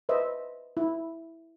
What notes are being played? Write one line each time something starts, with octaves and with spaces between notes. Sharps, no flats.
B4 C5 D#5 E5
E4